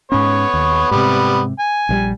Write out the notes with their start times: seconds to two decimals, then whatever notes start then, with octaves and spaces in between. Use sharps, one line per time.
0.12 G#2 B3 C#4 C#5
0.54 D#2
0.91 G#2 C3 G3 B3
1.59 G#5
1.89 A#1 C#3 G3